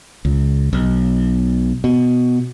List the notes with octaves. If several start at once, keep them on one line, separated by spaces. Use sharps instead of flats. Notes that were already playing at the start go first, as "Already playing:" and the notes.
C#2
B1
B2